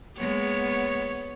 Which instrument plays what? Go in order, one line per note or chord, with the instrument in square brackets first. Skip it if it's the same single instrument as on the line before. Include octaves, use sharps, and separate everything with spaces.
[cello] G#3 A#3 [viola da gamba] B3 C#5